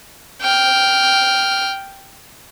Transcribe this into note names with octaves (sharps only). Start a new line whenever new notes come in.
G5 F6